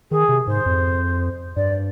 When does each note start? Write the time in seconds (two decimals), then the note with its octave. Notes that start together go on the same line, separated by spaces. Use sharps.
0.11 D#3 G#4
0.29 C3
0.47 G#2 C5
0.66 F2
1.56 G2 D5